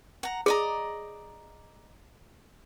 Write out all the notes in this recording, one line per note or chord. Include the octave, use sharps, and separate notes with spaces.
F#5 A#5
G#4 D5 D#5 A#5